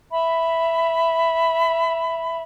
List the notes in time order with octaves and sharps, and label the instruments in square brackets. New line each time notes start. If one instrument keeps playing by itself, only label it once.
[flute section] E5 B5